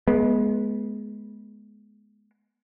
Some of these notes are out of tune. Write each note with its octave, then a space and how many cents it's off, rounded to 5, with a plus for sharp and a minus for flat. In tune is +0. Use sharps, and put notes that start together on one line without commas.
G#3 +20 B3 -20